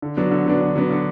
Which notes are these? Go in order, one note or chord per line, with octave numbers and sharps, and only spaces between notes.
D3
F#3 B3 D4
D3
F#3 B3 D4
D3
F#3 B3 D4
D3